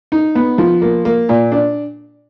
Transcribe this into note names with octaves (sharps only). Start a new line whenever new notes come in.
D#4
B3
F3
A#3
A#3
A#2
D4